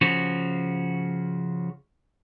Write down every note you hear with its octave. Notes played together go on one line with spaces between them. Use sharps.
C#3 F3 F#4